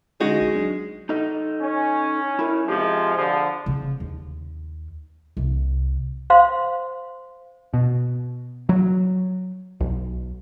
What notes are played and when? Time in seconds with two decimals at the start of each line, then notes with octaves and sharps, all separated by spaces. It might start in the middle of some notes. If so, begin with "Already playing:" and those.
0.20 D3 G#3 C#4 D#4 F4 F#4
0.41 A#1
0.54 F#3 C4 D4
1.09 D#4 A4 D#5
1.62 C#4
2.39 E4 A#4
2.69 C3 F3 G#3 G4 G#4
3.18 D3 F3
3.66 C#3 C4
4.00 D#2
5.37 C2
6.30 C5 F5 C6
7.74 B2
8.69 F#3
9.81 B1